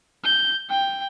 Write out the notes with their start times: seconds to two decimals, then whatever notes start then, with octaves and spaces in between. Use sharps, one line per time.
0.24 G6
0.70 G5